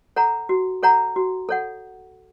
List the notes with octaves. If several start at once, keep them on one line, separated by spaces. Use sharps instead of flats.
A4 C#5 F#5 A#5
F#4
A4 C#5 F#5 A#5
F#4
A4 C#5 F#5